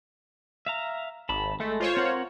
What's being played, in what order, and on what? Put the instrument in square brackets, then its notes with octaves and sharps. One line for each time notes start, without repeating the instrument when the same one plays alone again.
[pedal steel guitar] E5 F5 A#5
[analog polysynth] G#1 [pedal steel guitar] A5 B5
[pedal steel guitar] G#3 A4 [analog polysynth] A3
[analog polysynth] F4 C5 C#5
[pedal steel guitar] C4 A#4 F#5